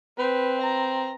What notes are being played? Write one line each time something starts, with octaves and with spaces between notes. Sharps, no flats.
C4 B4
A#5